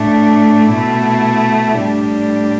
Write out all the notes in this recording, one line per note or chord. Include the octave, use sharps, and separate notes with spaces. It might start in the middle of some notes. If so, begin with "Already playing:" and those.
Already playing: A2 A3 D4
B2 A3 E4
A2 G3 D4